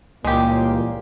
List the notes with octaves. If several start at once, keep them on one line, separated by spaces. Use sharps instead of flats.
C#2 A#2 E3 G3 G#3 A#3 G4